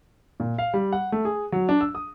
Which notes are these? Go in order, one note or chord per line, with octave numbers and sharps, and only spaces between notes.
A#2
F5
G3
F#5
A3
G#4
F#3
D4
E6
D#6